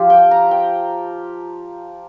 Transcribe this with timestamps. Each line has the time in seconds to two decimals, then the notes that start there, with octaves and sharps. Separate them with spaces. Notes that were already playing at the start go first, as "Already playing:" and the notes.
Already playing: F3 F4 G4
0.10 G5
0.31 A#5
0.51 G5